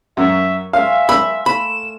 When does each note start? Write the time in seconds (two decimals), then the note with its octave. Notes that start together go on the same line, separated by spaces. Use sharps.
0.17 F#2 A#4 C#5 E5
0.73 F4 E5 F5 G#5
1.09 B5 E6
1.46 A3 B5 E7